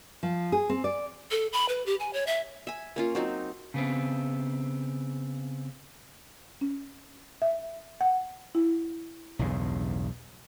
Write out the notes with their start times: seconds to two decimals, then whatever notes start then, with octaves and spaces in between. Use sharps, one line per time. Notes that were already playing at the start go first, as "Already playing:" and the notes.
0.23 F3
0.52 G#4
0.69 C4
0.84 D5
1.31 A4
1.53 B5
1.69 B4
1.86 G4
2.00 G#5
2.13 C#5
2.27 E5
2.67 E5 G#5
2.96 A#3 C#4 F4
3.15 F#3 C4 D#4
3.74 C#3 B3 C4
6.61 C#4
7.42 E5
8.01 F#5
8.55 E4
9.39 B1 E2 G2 C#3